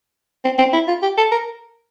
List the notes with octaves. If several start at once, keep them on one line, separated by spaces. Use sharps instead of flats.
C4
C4
E4
F4
G4
A4
A#4